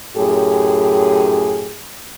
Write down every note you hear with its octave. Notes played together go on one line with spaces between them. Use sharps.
F#2 A2 G4 G#4